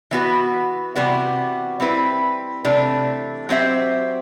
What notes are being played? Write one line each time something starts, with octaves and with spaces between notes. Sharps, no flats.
E3 B3 F#4 B4
C3 E3 G3 B3 F#4
G3 C4 E4 B4
C3 E3 A3 D4
F#3 C4 G4 C5 E5